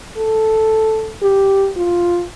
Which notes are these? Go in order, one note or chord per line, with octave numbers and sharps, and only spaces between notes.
A4
G4
F4